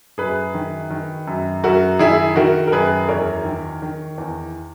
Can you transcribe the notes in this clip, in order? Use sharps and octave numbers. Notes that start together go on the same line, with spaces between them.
F#2 G#4 B4
D#3
D#3
F#2
F#2 F#4 A#4
D#3 E4 G#4
D#3 F#4 A#4
A#4
F#2 G#4 B4
E2 A#4 C#5
D#3
D#3
E2